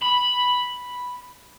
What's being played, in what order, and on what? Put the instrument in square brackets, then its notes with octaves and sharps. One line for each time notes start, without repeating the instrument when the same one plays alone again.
[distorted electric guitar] B5